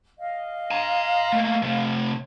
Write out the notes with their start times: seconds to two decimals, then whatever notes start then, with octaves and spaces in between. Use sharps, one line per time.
0.19 D#5 F5
0.71 G#5 A#5
1.33 A3 A#3
1.63 C3 A3